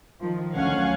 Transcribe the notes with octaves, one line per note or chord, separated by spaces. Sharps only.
D#3 F3
D2 F#3 C#4 F5 F#5 G#6